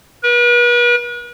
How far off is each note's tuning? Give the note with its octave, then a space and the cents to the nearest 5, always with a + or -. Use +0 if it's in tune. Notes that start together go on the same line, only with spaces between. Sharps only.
B4 -40